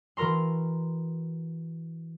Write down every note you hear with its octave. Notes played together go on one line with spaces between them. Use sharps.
E3 F#4 A#4 A#5 C6